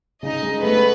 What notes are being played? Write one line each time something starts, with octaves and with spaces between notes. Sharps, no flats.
C#3 D#4 D#5
G#3
A3 B3 B4